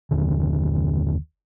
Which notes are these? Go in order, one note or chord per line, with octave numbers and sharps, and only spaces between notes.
F#1 D#2 D3